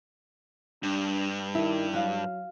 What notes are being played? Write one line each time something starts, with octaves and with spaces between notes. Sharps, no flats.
G2 D4
D#3 E4
F#3 F#4 F5